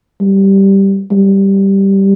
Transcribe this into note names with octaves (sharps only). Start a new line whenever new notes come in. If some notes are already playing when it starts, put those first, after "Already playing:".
G3
G3